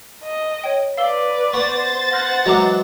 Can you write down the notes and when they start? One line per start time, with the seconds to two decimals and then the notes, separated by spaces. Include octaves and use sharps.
0.24 D#5
0.64 C#5 G5
0.97 B4 D5 F5 E6 G7
1.53 B3 C5 C#6 A6
2.12 F#5 F6 G6 A#6
2.46 E3 F#3 G#3 D#5 A#5 D6